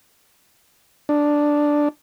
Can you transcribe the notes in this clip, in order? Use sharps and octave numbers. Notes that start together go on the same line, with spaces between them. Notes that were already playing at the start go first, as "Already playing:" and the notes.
D4